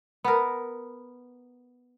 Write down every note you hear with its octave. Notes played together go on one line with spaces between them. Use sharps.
B3 A#4